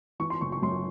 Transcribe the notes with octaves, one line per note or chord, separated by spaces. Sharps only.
E3 C#6
C6
F#1 C#6
C#6
F#2 C6